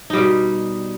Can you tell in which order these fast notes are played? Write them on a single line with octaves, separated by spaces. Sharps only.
D#4 G3 B2